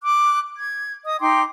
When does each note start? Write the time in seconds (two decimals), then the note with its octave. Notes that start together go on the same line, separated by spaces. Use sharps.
0.03 D6 F#6
0.58 G#6
1.05 D#5 D#6
1.20 D#4 G5 C6 D6